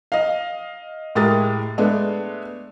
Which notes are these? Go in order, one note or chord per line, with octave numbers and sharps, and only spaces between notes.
D#5 F5
A2 G#3 G4 A#4 D#6 A6
G#3 A3 B3 D4